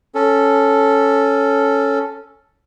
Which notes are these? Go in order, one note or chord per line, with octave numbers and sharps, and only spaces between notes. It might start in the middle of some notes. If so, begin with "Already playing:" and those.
C#4 A4